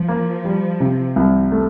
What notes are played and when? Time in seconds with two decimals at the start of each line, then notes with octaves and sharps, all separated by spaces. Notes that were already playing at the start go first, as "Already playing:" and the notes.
Already playing: F3
0.08 A#3
0.45 G3
0.80 C3
1.16 C2
1.52 A3